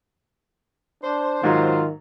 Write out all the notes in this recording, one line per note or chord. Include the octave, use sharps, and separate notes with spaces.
D4 C5
G#2 D#3 F#3 F4